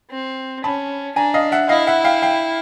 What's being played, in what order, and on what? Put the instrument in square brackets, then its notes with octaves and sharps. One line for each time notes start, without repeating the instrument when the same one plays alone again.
[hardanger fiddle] C4
[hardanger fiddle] C#4 [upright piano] A5 B5
[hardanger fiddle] D4 [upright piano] G#5 A#5
[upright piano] D#5 F5
E5 F#5
[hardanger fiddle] E4 [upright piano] D#5 F5
[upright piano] E5 F#5
F5 G5
F5 G5